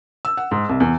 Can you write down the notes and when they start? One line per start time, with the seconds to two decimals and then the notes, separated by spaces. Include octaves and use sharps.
0.25 E6
0.37 F#5
0.51 G#2
0.69 C2
0.80 E2